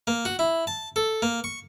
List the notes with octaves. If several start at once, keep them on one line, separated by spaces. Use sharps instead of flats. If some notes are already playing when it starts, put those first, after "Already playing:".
A#3
F#4
E4
A5
A4
A#3
C#6